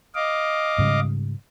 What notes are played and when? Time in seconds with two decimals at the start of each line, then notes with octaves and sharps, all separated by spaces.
0.15 D#5 F5 D6
0.78 G#2 C#3 G3